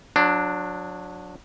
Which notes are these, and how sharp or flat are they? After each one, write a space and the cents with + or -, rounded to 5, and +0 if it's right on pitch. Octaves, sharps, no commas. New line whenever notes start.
F#3 -30 D4 +0